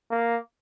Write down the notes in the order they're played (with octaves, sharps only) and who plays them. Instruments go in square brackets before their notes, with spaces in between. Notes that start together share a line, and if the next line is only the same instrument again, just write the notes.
[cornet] A#3